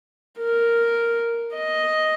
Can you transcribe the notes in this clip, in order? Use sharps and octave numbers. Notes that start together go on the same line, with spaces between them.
A#4
D#5